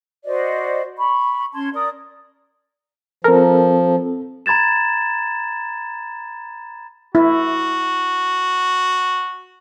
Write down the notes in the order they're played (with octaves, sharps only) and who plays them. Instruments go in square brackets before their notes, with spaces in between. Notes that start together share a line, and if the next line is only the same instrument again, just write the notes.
[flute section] F#4 C5 D5 D#5
B5 C#6
C#4 A5 C6 G#6
A#4 D5 D#6
[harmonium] F3 [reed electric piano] C4 A4 [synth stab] A#4
[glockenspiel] A#5 B5 G#6 A6 E7
[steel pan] E4 [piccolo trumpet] F#4